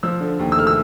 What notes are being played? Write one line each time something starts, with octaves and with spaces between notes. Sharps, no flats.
F3 E6
D3
D#2
E6
A3 F6
E6